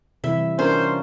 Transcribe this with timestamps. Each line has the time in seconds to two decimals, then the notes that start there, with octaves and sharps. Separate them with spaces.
0.24 C3 E3 G3 E4 E5
0.59 C#4 D4 F4 A#4 C5